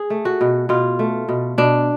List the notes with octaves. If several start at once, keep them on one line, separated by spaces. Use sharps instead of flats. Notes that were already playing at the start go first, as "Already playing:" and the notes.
Already playing: G#4
A3
F#4
B2
B2 F4
A3
B2
B2 D4